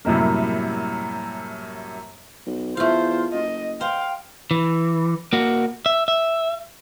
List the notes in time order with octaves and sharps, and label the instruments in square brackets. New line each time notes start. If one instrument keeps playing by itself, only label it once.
[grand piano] F#2 A2 C3 G3 A#3
[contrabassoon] B1
[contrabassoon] E2 [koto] A3 F5 [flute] F4 [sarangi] C5
[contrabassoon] F#1 [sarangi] D#5
[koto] C5 [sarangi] F5 [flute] G5
[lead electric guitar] E3
A#3 F#4
E5
E5